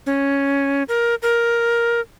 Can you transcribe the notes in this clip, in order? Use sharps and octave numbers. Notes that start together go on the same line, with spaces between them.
C#4
A#4
A#4